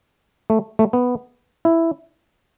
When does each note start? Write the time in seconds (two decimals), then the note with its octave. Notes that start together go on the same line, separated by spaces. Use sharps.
0.50 A3
0.79 A3
0.93 B3
1.65 E4